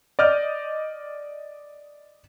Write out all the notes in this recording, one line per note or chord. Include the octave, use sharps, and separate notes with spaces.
D5 D#5 F6 G6